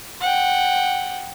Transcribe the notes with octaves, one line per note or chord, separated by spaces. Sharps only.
F#5 G5